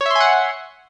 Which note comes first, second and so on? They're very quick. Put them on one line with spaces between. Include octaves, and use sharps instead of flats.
C#5 E5 C6 G#5 F#5